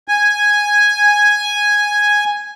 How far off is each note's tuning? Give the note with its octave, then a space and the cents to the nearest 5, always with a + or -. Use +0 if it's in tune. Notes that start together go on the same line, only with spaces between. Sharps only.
G#5 -5